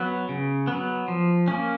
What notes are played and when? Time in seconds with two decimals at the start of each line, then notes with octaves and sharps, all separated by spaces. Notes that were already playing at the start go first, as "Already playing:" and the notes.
Already playing: F#3 B3
0.29 C#3
0.67 B3
0.72 F#3
1.08 F3
1.48 A#3 C#4